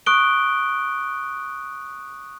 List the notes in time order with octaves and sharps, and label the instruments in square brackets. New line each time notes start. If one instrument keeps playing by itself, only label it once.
[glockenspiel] C#6 D#6 F#6 D7 G7